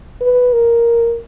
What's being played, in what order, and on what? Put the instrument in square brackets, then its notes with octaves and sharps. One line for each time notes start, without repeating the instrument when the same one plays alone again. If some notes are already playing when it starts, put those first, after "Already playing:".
[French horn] B4
A#4